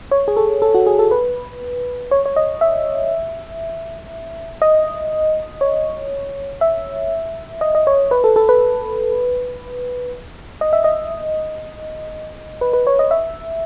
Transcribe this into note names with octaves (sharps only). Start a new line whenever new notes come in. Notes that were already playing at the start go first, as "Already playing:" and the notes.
C#5
G#4
A4
A4
F#4
G#4
A4
B4
C#5
C#5
D#5
E5
D#5
C#5
E5
D#5
D#5
C#5
B4
A4
A4
B4
D#5
E5
D#5
B4
B4
C#5
D#5
E5